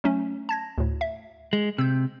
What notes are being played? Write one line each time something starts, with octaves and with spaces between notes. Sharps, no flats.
F#3 A3 C#4
A5 G#6 A#6
D2 A2
E5
G#3
C3 E6 G6